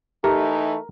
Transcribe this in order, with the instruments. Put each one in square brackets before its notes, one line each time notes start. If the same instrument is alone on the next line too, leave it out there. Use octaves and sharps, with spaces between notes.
[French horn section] E3 D#4 [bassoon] A3 [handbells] G4 [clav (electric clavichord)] A#4